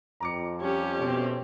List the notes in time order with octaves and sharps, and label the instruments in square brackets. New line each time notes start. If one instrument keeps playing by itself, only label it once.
[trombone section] F2 [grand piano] A#5 D6 C#7
[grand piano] G3 [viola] C#4 G4
[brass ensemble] B2 A3 C4